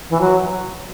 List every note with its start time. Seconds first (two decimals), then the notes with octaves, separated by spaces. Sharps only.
0.09 E3
0.20 F#3